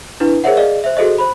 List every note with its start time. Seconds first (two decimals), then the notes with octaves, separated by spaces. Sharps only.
0.20 D4 E4 B4
0.44 G#4 A#4 C5 C#5 E5 F#5
0.57 G#4 D5 D#5 F5
0.84 C5 E5
0.97 F#4 G#4 A4 C5 D#5
1.18 C5 B5